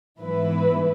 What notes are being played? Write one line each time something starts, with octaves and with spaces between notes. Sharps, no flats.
G#2 E3 B3 E4 B4